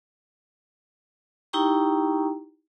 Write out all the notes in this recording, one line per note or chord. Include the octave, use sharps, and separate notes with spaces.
D#4 E4 G4 G5 A#5 C#6